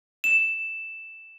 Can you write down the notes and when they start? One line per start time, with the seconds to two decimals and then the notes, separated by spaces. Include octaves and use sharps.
0.24 E7